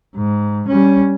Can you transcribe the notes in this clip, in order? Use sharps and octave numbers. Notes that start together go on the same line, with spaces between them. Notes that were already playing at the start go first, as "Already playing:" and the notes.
G#2
G3 C#4